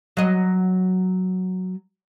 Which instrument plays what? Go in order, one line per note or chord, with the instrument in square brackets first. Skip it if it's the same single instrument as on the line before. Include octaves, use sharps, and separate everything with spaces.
[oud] F#3 D#5